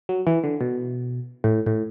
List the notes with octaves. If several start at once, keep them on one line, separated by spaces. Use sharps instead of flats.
F#3
E3
D3
B2
A2
A2